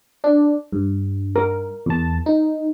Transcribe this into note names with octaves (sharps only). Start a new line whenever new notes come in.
D4
G2
A#4
E2 A5
D#4